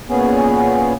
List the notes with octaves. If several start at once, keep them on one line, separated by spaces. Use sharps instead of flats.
A#2 B3 C#4 G#4